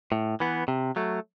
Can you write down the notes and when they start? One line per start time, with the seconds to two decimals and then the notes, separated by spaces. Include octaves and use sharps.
0.12 A2
0.40 E3 B3
0.68 C3
0.96 F#3 A3